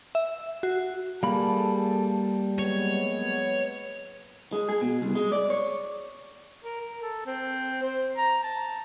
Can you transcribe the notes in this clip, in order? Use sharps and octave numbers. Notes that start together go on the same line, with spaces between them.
E5
F#4
G3 A#3 G#4 A4 F5 A5 B5
F#3 G#3 B3 C#5
G#3
G#4
B2
C2
G#3
D5
C#5
A#4
A#4
A4
C4
C5
A#5
A5